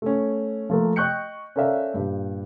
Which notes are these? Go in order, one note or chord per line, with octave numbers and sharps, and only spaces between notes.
A3 C#4
F3 A3 A#3
D#5 G5 C#6 F#6 G6 C#7
C#4 A4 A#4 D5 E5 F5
G2 A#2